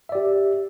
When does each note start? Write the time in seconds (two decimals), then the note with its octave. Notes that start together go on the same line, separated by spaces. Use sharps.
0.09 E5
0.12 D5
0.15 G4